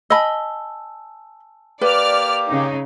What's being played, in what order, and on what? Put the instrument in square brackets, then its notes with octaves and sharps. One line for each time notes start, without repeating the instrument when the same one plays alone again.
[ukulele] D#5 B5 [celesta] G#5 A5 E6
[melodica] A#3 G4 [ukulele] B4 [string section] D5 F6
[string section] C#3 D#4